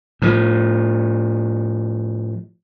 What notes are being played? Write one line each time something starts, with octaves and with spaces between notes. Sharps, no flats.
A2 F3